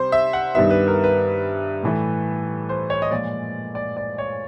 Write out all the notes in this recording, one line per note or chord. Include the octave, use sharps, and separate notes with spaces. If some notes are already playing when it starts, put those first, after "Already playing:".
Already playing: C3 G3 C5
E5
F#5
G2 D#3 G3 B3 E5
B4
A#4
B4
A2 E3 A3
C5
C#5
D#5
A#2 F3 G#3 D5
D5
D5
C#5